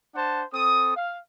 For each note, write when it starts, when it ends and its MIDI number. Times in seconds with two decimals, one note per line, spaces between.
0.15 0.43 62
0.15 0.43 72
0.15 0.43 78
0.15 0.43 81
0.54 0.94 60
0.54 0.94 69
0.54 0.94 87
0.96 1.17 77